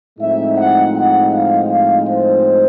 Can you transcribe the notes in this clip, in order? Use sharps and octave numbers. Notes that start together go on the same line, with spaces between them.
A2 F3 G#3 C4 D#4 E5
F#5
F#5
F5
F5
C5